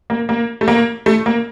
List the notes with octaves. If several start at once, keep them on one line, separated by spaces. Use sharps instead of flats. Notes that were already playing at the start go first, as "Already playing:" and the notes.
A#3
A#3
A3
A#3
A3
A#3